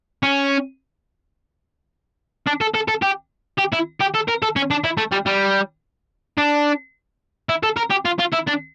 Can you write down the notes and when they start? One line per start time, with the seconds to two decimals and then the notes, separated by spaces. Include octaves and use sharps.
0.23 C#4
2.47 D4
2.61 A4
2.74 A4
2.88 A4
3.02 G4
3.58 G4
3.73 E4
4.00 G4
4.14 A4
4.28 A#4
4.42 A4
4.56 C#4
4.71 D4
4.84 E4
4.98 A3
5.12 G3
5.26 G3
6.38 D4
7.49 E4
7.63 A4
7.77 A#4
7.91 G4
8.06 F4
8.19 F4
8.33 E4
8.48 D4